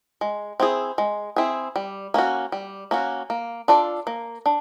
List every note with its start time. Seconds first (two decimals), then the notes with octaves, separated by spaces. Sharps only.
0.21 G#3
0.60 C4 E4 G#4
0.98 G#3
1.36 C4 E4 G#4
1.76 G3
2.14 A#3 C#4 F#4
2.52 G3
2.91 A#3 C#4 F#4
3.30 A#3
3.68 D4 F4 A4 D5
4.07 A#3
4.46 D4